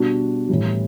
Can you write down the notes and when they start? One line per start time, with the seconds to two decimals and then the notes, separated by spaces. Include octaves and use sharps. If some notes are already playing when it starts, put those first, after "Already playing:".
Already playing: B2 G3 D4 F#4
0.49 A2 E3 G3